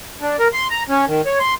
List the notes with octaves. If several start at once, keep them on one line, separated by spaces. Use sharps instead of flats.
D4
A#4
C6
A#5
C#4
D#3
C#5
C6